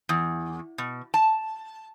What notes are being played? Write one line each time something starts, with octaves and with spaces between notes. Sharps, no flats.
E2
B2
A5